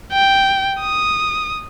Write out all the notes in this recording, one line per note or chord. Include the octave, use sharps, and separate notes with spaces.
G5
D#6